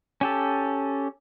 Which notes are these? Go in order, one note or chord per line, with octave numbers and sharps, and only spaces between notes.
C#4 G4 A4